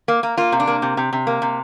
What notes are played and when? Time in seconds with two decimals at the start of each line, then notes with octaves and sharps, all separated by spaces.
0.08 A#3
0.23 A#3
0.37 A#3 F4
0.52 C3
0.60 D4
0.67 A#3
0.82 C3
0.97 C3
1.13 C3
1.27 A#3
1.42 C3